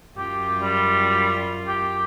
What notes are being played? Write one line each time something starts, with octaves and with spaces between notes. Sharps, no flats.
F#2 F4 G4
G3
G4